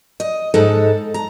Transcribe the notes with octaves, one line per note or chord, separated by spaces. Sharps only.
D#5
G#2 G#3 D#4 A4 F#5
A#5